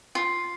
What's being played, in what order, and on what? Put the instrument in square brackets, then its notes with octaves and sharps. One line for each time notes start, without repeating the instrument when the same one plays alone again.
[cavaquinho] F4